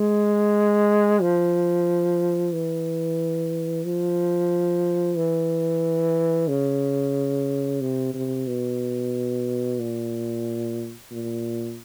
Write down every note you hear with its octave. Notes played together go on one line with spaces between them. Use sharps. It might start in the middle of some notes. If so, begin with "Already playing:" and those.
Already playing: G#3
F3
E3
F3
E3
C#3
C3
C3
B2
A#2
A#2